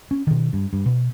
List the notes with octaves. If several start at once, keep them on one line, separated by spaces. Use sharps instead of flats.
C#4
B2 D#3
G2
G2
B2